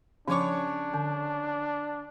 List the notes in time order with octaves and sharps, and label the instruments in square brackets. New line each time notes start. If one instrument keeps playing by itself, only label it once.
[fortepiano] C#3 C#5 C#6 [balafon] F3 D6 [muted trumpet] D4
[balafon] D3